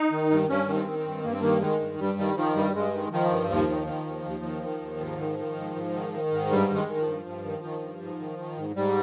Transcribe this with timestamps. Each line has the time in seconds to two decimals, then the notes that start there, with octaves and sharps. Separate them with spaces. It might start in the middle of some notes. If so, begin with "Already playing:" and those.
Already playing: D#4
0.12 D#3
0.30 G2
0.48 G2 C#4
0.68 D#3
0.74 C4
0.87 D#3
0.99 C4
1.05 G2
1.24 G2 A#3
1.32 C4
1.40 D#3 A#3
1.61 D#3 G#3
1.80 G2
1.99 G2 G3
2.19 D#3 G3
2.36 D#3 F3
2.56 G2 G3
2.74 G2 G#3
2.94 D#3
3.12 D#3 F3
3.31 G2
3.50 D#2 F3
3.69 D#3
3.87 D#3
4.06 D#2
4.25 D#2
4.44 D#3
4.63 D#3
4.81 D#2
5.00 G#2
5.19 D#3
5.38 D#3
5.56 G#2
5.76 G#2
5.94 D#3
6.13 D#3
6.31 G#2
6.50 G2 G3
6.70 D#3
6.76 G#3
6.88 D#3
7.00 F3
7.07 G2
7.26 G2
7.45 D#3
7.63 D#3
7.82 G2
8.01 G#2
8.20 D#3
8.39 D#3
8.57 G#2
8.76 G#2 G3